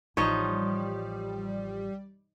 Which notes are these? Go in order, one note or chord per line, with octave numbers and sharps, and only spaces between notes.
A1 F3 G3 D#4 C#5